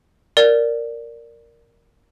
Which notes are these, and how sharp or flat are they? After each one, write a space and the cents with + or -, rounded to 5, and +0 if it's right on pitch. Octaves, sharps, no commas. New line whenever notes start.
A#4 +0 D5 +0